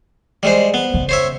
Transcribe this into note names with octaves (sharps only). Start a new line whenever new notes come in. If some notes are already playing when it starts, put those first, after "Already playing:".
G3 G#3 C5
B3
C#3
C5 C#5 E5